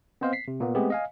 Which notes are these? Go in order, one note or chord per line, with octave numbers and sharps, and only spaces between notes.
B3 C4 C5 D#5 F5
B6 C7
C3
A#2 A#3 B3
G#3 A3 B3 C4 G4 G#4
D#5 F5 G#5